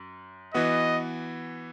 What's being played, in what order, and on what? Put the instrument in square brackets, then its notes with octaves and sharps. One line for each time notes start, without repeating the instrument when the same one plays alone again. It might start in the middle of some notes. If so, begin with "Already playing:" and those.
Already playing: [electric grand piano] F#2
[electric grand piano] E3 B3 F#4 [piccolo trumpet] D#5